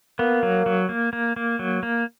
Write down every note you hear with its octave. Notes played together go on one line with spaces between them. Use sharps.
A#3 B3
F#3
F#3
A#3
A#3
A#3
F#3
A#3